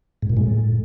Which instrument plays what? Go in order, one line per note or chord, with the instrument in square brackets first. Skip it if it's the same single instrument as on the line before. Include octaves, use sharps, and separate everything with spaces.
[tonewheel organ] G#2
A#2
G#3
A2